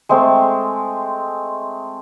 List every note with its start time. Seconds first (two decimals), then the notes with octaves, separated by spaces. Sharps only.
0.09 G#3 A3 C4